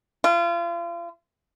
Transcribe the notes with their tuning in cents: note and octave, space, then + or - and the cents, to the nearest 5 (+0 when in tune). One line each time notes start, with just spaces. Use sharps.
F4 -35